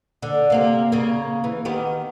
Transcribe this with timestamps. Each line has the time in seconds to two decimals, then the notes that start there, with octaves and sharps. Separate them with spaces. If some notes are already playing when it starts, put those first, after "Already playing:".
0.22 D3
0.50 C3 A#3 G4
0.92 C#3 A#3
1.44 E3
1.65 D#3 B3 G4